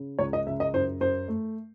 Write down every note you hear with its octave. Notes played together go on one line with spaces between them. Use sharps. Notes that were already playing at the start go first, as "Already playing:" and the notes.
Already playing: C#3
C#2 C#5
D#5
C#3 E5
D#5
F#2 C5
F#2 C5
A3